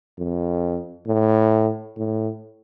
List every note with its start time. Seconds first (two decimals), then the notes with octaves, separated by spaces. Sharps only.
0.18 F2
1.07 A2
1.97 A2